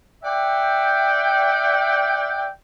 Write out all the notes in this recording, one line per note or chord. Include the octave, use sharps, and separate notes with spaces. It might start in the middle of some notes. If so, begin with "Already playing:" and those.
D5 E5 F#5 G5